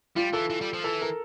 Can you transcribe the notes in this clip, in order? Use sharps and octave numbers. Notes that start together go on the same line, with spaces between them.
G3 F4
E3 A4
E3
G3
F3
E3 A4
A#4